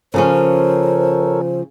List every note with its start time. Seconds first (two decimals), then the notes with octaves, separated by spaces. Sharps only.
0.14 C#3 F3 C#4 A4 A#4 C5 C#5